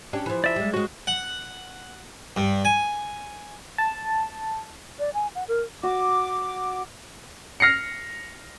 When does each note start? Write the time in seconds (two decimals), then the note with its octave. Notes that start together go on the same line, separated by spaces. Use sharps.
0.13 C#4 D4 G4
0.26 E3 F3
0.44 D5 E5
0.56 G3 G#3
0.74 G#3 C#4 F#4
1.07 F#5
2.36 G2
2.65 G#5
3.78 A5
4.99 D5
5.14 G#5
5.35 F#5
5.48 A#4
5.83 F#4 D6
7.60 F6 A#6 C7 C#7